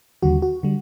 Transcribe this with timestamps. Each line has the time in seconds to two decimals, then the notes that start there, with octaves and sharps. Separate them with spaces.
0.23 D#2 D3 G3 F#4
0.42 F#4
0.63 D3 G3